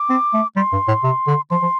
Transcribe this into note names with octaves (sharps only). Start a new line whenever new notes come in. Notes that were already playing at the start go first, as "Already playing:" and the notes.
Already playing: D6
C4
A3
G3 C6
G2
A2
C3
D3
F3 C6
F3